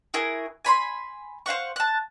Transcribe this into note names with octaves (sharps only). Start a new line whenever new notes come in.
E4 F#4 G#4 A#4
G#5 B5 C6
C5 F5 F#5 C#6
A5 F#6